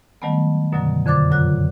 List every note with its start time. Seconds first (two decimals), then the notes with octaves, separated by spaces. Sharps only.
0.22 D#3 F#3 G3 A3 B3
0.72 F#2 B2 D3 F#3
1.06 F2 D3 C5 D6 A6
1.31 F#2 A#2 C#3 F#3 F4 F#6